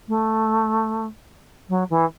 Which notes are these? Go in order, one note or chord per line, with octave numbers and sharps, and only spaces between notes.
A3
F#3
E3